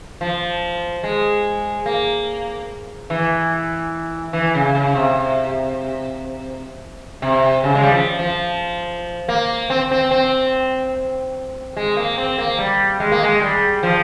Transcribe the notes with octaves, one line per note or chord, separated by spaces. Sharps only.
F3
G#3
A#3
E3
E3
C#3
C#3
C3
C3
C#3
G#3
G3
F3
F3
A#3
C4
C4
C4
G#3
A#3
C4
A#3
G3
G#3
A#3
G#3
G3
F3